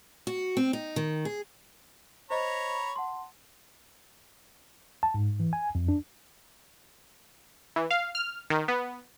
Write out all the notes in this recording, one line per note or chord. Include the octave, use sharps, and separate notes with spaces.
F#4
C4
D#4
D#3
G#4
C5 C#5 D#5 A#5 B5 A6
F#5 A5 C6
A5
G#2
E3
G#5
F2
D4
E3
F5
F6
D#3
B3